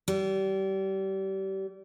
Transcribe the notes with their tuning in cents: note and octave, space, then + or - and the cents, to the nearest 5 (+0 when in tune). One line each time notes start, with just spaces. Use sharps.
G3 -30